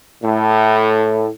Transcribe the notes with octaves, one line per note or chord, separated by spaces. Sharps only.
A2